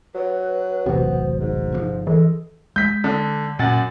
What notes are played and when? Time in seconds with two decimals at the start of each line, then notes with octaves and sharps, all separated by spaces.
0.15 F#3 B4
0.86 E1 A1 C3 F#3 B3 C5
1.40 G#2 D#4
1.72 G1 C#3 F3
2.07 E3 G#3 A4
2.76 G#3 G6 B6
3.04 D3
3.59 F#2 A#2 F#5 A6